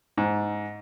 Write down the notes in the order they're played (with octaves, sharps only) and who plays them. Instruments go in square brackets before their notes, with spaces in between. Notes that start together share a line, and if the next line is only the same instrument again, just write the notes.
[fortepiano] G#2